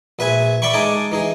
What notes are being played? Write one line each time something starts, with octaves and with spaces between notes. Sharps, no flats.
A#1 B4 E5 G#5
D5 E5 G5 B5 C#6
G#3 D#4 A4 G#5 D6
E3 D#4 G#4